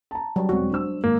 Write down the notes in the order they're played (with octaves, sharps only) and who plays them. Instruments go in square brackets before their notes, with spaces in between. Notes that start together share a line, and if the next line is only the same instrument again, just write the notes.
[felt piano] A5 A#5
[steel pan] F#3 G3
[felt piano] E1 C4 [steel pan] F#4
[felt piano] D4 C5 E6
[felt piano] G#1 [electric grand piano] A#3